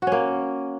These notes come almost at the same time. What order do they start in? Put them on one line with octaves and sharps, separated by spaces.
F#4 C#4 A#3